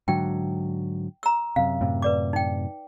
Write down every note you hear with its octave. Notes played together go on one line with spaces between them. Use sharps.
G#2 D3 F#3 G5
A#5 E6
F#2 C3 F5
F#2 A2 C3
B4 D5 D6
D#4 G5